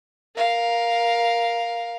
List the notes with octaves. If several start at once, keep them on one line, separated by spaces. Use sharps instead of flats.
A#4 F5